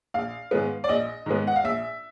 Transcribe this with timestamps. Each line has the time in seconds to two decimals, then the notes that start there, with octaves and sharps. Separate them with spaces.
0.14 A#1 F5
0.51 G#2 D#3 G#3 B3
0.84 D5
0.89 A#1 D#5
1.26 G#2 D#3 G#3 B3
1.47 F#5
1.56 F5
1.64 A#1 E5